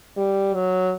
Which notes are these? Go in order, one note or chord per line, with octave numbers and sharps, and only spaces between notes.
G3
F#3